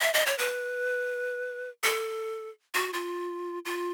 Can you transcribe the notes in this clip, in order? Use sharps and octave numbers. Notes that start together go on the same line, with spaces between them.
E5
D#5
C#5
B4
A4
F#4
F4
F4